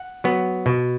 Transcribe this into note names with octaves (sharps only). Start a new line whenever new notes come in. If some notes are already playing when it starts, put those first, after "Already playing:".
Already playing: F#5
F#3 B3
B2